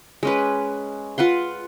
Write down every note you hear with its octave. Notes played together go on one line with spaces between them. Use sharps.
G#3 C#4 B4
F4 B4 F#5 C6